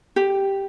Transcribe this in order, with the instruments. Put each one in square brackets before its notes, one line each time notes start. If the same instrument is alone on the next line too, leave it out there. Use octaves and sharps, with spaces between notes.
[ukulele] G4